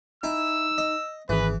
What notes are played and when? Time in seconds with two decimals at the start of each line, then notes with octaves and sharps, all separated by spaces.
0.23 D#4 E4 G#5 E6
0.78 D#5
1.29 G#1 E3 G#4 B4